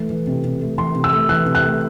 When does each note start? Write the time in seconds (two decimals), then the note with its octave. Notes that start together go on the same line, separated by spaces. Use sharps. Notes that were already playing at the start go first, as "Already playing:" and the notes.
Already playing: E3 A3
0.10 E3
0.27 C3
0.44 C3
0.61 A3
0.78 E3 C6
0.95 C3
1.04 E6
1.12 A3
1.29 E3 F#6
1.46 C3
1.55 F#6
1.63 A3